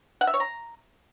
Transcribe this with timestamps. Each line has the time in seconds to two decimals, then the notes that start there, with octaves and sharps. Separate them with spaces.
0.21 F#5
0.27 E5
0.34 C#5
0.40 A#5